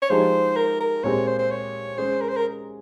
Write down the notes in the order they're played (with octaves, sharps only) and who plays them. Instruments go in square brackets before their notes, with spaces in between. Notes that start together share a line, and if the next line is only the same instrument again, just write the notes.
[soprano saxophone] C#5
[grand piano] F3 G#3 D#4 G4 [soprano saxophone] C5
[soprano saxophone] A#4
A#4
[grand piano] A#2 G#3 C4 G4 [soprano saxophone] C#5
[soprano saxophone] C5
C5
C#5
[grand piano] G#3 C#4 G#4 [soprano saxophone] C5
[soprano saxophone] A#4
C5
A#4